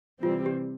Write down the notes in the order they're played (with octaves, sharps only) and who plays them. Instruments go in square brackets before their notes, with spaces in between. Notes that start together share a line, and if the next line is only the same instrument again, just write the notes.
[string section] C3 E3 G3 C4 [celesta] F4
[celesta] G4